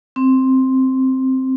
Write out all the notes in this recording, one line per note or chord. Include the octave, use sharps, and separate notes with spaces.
C4